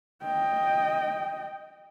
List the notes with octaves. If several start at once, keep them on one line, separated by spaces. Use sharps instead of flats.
D#5 G5